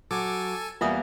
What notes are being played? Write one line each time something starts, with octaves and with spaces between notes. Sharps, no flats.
F#3 A4 G#5 D6
E2 G3 A#3 B3 F4 E5 G#5 D#6